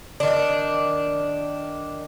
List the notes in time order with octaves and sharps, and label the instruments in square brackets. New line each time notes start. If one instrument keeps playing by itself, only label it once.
[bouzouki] D#3 D4